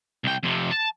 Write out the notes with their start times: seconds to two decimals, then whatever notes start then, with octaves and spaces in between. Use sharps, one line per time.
0.24 C2 G5
0.43 F2 C3
0.71 A5